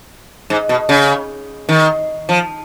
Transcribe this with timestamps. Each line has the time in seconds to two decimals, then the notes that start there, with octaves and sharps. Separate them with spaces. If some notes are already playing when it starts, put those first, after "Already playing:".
0.50 G#2
0.69 B2
0.89 C#3
1.69 D#3
2.29 F3